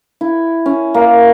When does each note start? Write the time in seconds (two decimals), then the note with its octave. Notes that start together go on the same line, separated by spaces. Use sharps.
0.21 E4
0.66 C#4
0.94 A#3